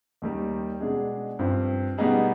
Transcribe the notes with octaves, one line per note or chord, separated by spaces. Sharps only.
D#2 D#3 G3
B2 G#3 D4 G#4
G2 F3 C4
B2 G3 B3 D#4 G#4